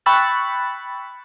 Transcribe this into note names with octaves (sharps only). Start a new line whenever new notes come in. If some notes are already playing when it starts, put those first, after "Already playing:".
G5 B5 C#6 E6 F#6 A6